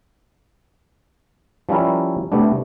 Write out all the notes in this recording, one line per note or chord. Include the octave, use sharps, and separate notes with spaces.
F3 G3 C#4 E4 A#4
C3 G3 A3 B3 D4